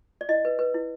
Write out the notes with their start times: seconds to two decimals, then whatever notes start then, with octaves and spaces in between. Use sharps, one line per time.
0.21 D5
0.29 E4 D#5
0.45 B4
0.59 B4
0.74 E4